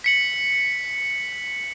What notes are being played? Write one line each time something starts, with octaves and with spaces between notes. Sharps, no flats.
B6 C#7 F#7